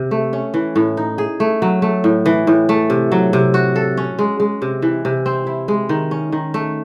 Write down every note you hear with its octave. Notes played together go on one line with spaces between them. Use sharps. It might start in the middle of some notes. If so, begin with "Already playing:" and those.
Already playing: C3 C4
A3
C#4
E3
A2
D#4
G#4
A3
F#3
A3
A2
E3
A2
A3
C3
F#3
C3
F#4
A4
C#4
G#3
G#3
C3
E3
C3
C4
E4
G#3
D#3
C#4
D#3
A3